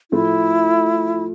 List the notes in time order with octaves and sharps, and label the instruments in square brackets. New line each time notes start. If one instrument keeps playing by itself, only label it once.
[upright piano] A2 F3 A3 [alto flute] E4